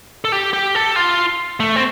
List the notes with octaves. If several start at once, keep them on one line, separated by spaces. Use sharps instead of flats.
A4
G4
G4
A4
F4
A3
C4